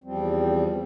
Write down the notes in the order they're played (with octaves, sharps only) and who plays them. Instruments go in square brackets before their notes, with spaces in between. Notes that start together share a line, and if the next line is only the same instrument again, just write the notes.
[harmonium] E2 F3 G3 C4